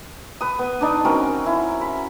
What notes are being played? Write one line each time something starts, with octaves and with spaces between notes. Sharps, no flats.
B4 D#6
B3
D4 D#4 D5
C4 C#4 F#4 A#4
E4
B5